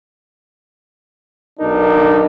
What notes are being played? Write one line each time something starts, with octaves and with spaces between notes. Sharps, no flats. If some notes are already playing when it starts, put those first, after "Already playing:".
B1 D4 D#4 A#4